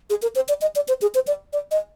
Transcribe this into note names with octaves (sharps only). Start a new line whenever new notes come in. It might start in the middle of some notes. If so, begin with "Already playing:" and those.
G#4
A#4
C5
D5
D#5
D5
C5
G#4
C5
D5
D5
D#5